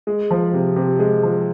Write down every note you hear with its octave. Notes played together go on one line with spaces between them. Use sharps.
G#3
F3
C3
C3
G#3
F3